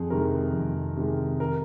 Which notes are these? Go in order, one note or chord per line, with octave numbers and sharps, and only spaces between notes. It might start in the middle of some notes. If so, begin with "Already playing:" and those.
Already playing: F2 G#4
C3 D#3 G#3 A#4
F2
C3 D#3 G#3
A#4